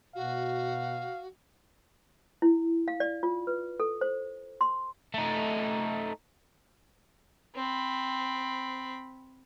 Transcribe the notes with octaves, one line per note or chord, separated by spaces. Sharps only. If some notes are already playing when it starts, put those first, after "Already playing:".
B2 F#4 F5
E4
F5
D5
F4
B4
A4
C5
C6
A3 D#4
C4 B5